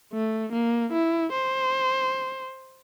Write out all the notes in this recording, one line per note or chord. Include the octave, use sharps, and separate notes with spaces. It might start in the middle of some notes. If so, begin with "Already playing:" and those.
A3
A#3
E4
C5